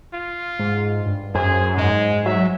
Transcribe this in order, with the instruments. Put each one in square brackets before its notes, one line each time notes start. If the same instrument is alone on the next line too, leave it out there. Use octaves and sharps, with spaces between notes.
[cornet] F4
[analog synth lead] G#2
G2
[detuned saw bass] F#2 [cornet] G#4 [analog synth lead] C5
[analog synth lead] G#2 [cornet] G#3
[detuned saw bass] F#3 [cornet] E5